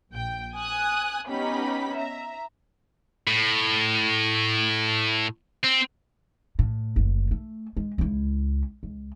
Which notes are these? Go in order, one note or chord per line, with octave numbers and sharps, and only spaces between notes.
A#1 G5
G#5 D#6 F#6
B3 C#4 D#4 G4 B5
E5 A#5
A2
C4
A2
F#1 D2
A3
G#3
C#2 E4
C#2